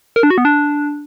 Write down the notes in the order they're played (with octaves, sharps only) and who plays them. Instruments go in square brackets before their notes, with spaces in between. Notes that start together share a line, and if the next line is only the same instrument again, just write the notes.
[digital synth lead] A#4
D4
F#4
B3
D4